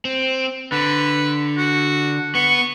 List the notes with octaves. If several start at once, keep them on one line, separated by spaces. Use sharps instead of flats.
C4
D3 B4
F#4
B3 C#6